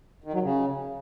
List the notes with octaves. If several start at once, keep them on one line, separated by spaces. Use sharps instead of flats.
D#3
F#3
C#3